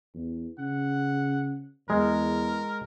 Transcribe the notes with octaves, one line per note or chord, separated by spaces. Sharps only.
E2
C#3 F#5
E2 G#3 A#4